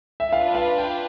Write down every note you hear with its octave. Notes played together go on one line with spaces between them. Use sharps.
E5
D4 F4 B4 F5
F5
G5